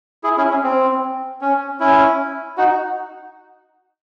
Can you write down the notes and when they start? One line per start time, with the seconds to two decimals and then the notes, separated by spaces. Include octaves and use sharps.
0.24 E4 G#4
0.37 C#4 E4
0.50 C#4
0.64 C4
1.41 C#4
1.80 C#4 E4
2.58 D#4 F#4